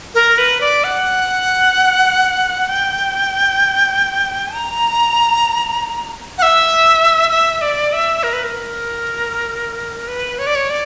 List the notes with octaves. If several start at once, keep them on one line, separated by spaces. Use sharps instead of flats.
A#4
B4
D5
F#5
G5
A#5
F#5
E5
E5
D5
E5
A#4
B4
A#4
B4
C#5
D5
C#5
D5